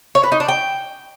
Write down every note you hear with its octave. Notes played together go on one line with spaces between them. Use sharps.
C#5
B4
D#4
D4
G5